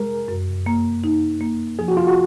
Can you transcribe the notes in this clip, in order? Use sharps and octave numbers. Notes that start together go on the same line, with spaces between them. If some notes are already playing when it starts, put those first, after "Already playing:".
Already playing: G#3 G#4 A#4
F#2
A#3
D#4
A#3
F3 G#4
F#4
F4
F#4